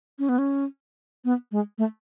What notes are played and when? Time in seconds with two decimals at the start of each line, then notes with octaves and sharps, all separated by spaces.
0.19 C#4
0.29 B3
0.38 C#4
1.25 B3
1.52 G#3
1.78 A3